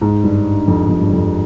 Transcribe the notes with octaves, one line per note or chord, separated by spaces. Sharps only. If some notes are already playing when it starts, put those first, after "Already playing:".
G#2
G2
F2
F2
G2
F2